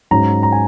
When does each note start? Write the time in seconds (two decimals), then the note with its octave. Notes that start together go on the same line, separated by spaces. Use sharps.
0.11 G#2 F#3 C#4 A#5
0.43 A#5
0.52 G#5